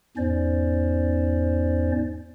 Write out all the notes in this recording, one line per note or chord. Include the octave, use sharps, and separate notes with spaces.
E2 G#2 C#4 C5 D5